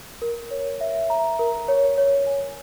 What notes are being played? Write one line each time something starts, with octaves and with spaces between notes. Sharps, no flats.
A#4
C#5
E5
A#5
A#4
C#5
C#5
G#5